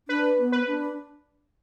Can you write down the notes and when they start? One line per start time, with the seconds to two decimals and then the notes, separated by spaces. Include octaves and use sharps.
0.08 D4 B4
0.39 B3
0.52 B4
0.67 D4